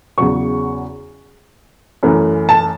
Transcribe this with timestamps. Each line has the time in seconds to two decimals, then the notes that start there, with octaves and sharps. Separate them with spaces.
0.18 E2 C#3 F#3 C#6
2.03 F#2 E3 A3
2.49 A5